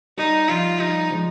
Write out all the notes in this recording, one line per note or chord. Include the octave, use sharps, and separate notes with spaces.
G3 D#4
F3 F4
G3 D#4
F3 G#3